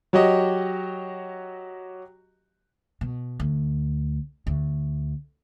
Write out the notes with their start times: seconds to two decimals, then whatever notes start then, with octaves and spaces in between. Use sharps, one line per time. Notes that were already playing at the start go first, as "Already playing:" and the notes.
0.13 F#3 F#4 G4 D#5
3.01 B2
3.40 D2
4.47 D2